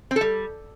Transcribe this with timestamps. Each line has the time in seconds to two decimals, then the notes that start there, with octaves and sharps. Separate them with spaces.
0.11 C4
0.16 A4
0.21 G3